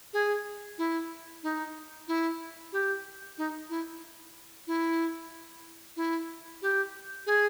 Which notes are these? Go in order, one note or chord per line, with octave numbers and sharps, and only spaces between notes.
G#4
E4
D#4
E4
G4
D#4
E4
E4
E4
G4
G#4